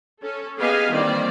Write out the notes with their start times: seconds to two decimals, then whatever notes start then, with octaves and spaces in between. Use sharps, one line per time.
0.20 C#4 A4
0.57 B3 G4 G#4 D#5 F5 G#5
0.90 D#3 E3 G3 A#3 C4 D5